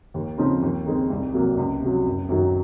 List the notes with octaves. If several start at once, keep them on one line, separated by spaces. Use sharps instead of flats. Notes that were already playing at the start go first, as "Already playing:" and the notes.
D#2
C#3 F3 C4 D#4
D#2
D#3 G#3 C4
C2
C3 F#3 A#3
C#2
C3 F#3
F#1
F#2 D#3 F#3